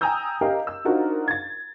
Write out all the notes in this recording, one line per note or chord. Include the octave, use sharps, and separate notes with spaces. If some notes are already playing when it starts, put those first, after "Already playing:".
G5 G#5 A#5 D#6 E6 G6
G4 A#4 D#5 F5 G5
E6
D4 D#4 F4 F#4 A#4 C5
G#6 A6